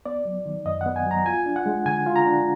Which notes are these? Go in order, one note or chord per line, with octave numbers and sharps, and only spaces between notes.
B3 D5
F#3
D#3
F#2 D#5
F#5
B3
G#5
F#3
A#5
F4 G#5
D4
F#5
G#3
D3 G#5
F4
A#5
D4